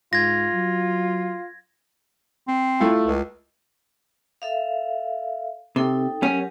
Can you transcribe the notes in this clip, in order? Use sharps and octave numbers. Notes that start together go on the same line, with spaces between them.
G#2 F4 G#6 A#6
F#3
C4
A3 E4 F4
C#2
A4 E5 F5
C3 D#4 A4 G5
F#3 C#4 G4 A#4